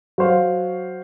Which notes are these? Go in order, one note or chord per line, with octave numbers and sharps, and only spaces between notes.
F#3 F#4 C5 F5